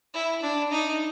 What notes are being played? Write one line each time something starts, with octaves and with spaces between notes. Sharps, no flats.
E4
D4
D#4